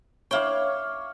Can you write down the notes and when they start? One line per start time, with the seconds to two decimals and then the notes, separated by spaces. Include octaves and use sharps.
0.31 E4 C#5 F5 G5 D6